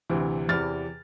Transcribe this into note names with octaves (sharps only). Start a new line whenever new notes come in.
D2 C3 E3
E2 C3 E3 F6 A6